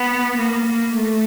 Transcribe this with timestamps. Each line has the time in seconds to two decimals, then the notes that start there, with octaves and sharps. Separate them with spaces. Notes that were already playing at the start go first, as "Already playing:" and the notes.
Already playing: B3
0.36 A#3
0.65 A#3
0.94 A3